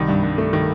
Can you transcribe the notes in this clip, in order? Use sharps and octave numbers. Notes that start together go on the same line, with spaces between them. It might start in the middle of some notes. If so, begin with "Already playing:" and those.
Already playing: C2 D#3
G2
G2
A3
D#3